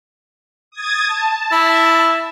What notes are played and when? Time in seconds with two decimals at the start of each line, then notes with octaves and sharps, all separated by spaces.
0.71 D#6 G#6 A6
1.06 A5
1.51 E4